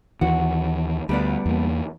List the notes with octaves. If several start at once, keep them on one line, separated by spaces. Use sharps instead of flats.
D#2 E3 F#4
D2 G3 B3 D4
E2 A#3